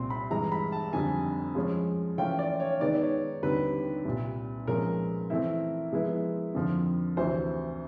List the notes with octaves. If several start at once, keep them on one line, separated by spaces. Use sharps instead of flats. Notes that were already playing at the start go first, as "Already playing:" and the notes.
Already playing: C2 A#2 G3 C4 C6
B5
G2 E3 G#3 A#5
B5
A5
F2 D3 G3 G#5
F3 G#3 C#4
E3 A3 C#4 F4 G5
D5
C#5
D#3 G#3 B3 D#4 D5
C#5
D#2 D3 G3 C4 D#4 B4
C2 A#2 G3
A#2 F3 G#3 C#4 A#4
E3 A3 C4 E4
F3 G#3 B3 E4
F2 D3 F3
D2 C3 E3 C5